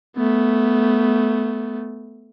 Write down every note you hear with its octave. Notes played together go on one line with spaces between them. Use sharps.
A3 B3